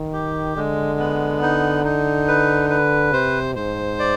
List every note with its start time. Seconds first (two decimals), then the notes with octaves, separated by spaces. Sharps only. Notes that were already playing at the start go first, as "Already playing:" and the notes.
Already playing: D#3
0.13 G4
0.56 D3 G#3
0.99 B3
1.42 D#4
1.84 D#4
2.28 B4
2.70 B4
3.12 C3 C5
3.55 G#2 C5
3.99 D5